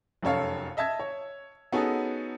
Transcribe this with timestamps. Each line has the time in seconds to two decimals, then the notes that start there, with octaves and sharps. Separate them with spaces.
0.22 F1 F#2 A4 C#5 F5
0.77 D#5 E5 A5 E6 G#6
1.00 C#5
1.72 B3 C#4 D#4 F#4 G#4 A4